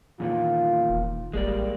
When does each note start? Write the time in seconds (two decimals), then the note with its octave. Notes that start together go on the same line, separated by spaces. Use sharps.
0.20 E2 A#2 D#3 F4
0.90 E1
1.33 A1 G3 G#3 A#3 D5